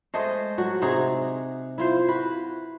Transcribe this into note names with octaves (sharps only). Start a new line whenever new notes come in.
G#3 A3 C5 D#5
F#3 F#4
C3 D#4 F#4 G#4
E4 F4 C5
F#4 B4